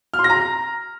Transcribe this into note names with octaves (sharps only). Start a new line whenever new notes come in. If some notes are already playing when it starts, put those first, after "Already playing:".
F6
C6
A#6
A#5